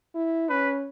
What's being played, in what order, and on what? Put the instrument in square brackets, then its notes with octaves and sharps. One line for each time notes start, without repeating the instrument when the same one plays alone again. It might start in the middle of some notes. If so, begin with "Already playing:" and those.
[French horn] E4
[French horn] C#4 [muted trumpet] B4